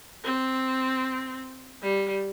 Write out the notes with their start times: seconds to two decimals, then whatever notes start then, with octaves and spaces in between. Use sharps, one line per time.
0.24 C4
1.82 G3